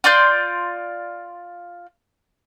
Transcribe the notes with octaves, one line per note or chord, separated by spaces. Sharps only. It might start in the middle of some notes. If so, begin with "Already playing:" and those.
F4 D5 C6 G6